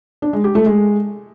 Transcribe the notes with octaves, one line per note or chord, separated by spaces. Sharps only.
D4
G#3
G4
A3
G#3